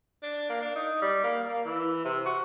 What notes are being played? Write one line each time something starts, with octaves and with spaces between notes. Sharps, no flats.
D4
A#3
D4
D#4
G3
A#3
A#3
E3
C3
F#4